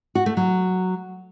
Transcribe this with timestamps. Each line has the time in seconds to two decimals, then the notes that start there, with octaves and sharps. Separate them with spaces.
0.15 F#4
0.26 A3
0.37 F#3